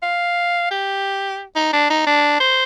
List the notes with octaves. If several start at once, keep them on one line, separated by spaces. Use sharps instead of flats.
F5
G4
D#4
D4
D#4
D4
C5